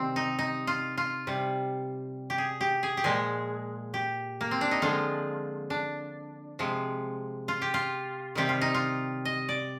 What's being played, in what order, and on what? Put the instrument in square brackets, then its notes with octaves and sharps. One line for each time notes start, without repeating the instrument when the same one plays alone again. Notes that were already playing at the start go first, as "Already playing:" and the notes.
Already playing: [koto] C3 D#3 G3 C4
D#4
D#4
F4
F4
C3 G3
G4
G#4
G4
G#4
G4
A#2 F3 G#3 G#4
G4
A#3
C4
D4
D#4
D3 F3 G#3 F4
D4
C3 F3 G#3
F4
G4
F4
C3 D#3 G3 G4
F4
D#4
F4
D#5
D5